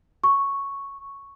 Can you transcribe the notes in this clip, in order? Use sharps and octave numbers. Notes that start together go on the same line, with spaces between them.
C#6